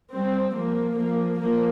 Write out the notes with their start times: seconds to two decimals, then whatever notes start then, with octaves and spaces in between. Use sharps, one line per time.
0.13 G3 C4
0.55 F3 A#3
0.97 F3 A#3
1.40 F3 A#3